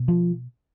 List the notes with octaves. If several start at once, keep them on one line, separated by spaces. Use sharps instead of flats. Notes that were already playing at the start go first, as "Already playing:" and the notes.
Already playing: B2
F3